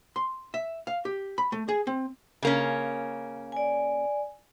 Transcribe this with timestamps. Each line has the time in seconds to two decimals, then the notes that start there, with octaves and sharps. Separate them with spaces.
0.16 C6
0.54 E5
0.87 F5
1.05 G4
1.38 B5
1.52 A3
1.69 G#4
1.87 C4
2.43 C#3 A#3 C#4
3.52 D5 G#5